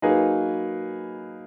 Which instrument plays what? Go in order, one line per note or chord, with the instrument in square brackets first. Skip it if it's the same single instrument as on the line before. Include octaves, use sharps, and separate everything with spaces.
[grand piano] F#3 A#3 D#4 G#4 B4